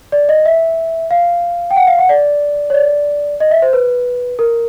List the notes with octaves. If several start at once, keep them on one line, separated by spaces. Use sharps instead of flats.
D5
D#5
E5
F5
G5
F#5
F5
F#5
D5
C#5
D5
D#5
E5
C5
B4
A#4